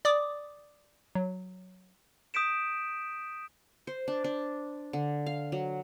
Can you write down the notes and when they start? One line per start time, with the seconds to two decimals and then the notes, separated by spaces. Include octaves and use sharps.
0.05 D5 D6 D#6
1.15 F#3
2.34 D#6 G6 B6 D7 E7
3.87 C5
4.08 D4
4.24 D4
4.93 D3
5.26 F5
5.52 F#3